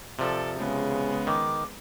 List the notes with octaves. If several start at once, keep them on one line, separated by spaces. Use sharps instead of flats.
C3 F3 A4 D5
C#3 G#3 B3
D#3 D6